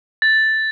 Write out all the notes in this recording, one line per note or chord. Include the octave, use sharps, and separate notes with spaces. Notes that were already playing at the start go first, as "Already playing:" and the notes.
A6